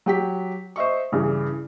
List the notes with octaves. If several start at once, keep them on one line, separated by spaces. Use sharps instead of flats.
F#3 G4 B6
C5 D#5 E5 C#6
G2 C#3 E3